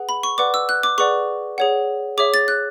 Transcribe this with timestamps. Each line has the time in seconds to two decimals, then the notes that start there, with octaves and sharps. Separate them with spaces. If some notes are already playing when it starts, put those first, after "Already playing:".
Already playing: G#4 B4 F#5
0.09 B5
0.23 C#6
0.38 B4 D5 F#5 D6
0.54 E6
0.69 F#6
0.83 D6
0.98 G#4 B4 D5 F#5 C#6
1.58 G#4 C#5 F#5
2.17 G#4 C#5 E5 D6
2.34 A6
2.48 F#6